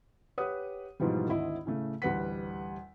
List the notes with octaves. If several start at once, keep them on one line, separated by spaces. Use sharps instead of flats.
G4 B4 C#5 F#5 D#6
G#2 B2 E3 F3 G3
G#1 D2 E4 D#5
A2 C#3 A3
A1 D2 G3 B4 F#5 B6